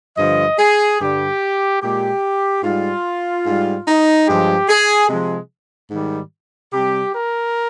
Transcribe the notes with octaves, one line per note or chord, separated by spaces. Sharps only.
G2 D3 F3 D#5
G#4
G2 D3 G3 G4
A#2 G#3 G4
G#2 G3 F4
G#2 G3
D#4
G2 F3 G#3 G4
G#4
C3 F3 G#3
G#2 D#3 G3
C3 G3 G4
A#4